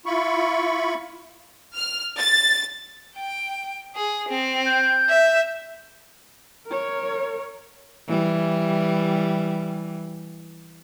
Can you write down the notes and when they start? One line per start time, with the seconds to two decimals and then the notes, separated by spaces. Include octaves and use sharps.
0.06 E4 F4 B5 C#6
1.75 F6
2.19 A6
3.16 G5
3.95 G#4
4.29 C4
4.66 G6
5.10 E5
6.67 A#4 C#5
8.08 E3 G3